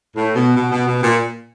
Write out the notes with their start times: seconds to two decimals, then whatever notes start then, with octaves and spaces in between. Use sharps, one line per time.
0.15 A2
0.35 B2
0.56 B2
0.71 B2
0.86 B2
1.02 A#2